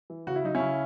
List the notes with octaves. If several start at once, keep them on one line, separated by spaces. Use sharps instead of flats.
E3
C#3 F#4
E4
F#3 D#4
C#4 E4
C#3